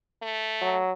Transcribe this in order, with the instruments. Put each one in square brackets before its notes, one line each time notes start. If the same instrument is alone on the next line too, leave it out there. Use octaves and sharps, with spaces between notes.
[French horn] A3
[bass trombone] F#3